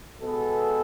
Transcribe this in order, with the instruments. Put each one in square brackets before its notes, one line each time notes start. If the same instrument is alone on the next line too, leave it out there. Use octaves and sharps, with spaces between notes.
[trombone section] B2 G#3 B3 A4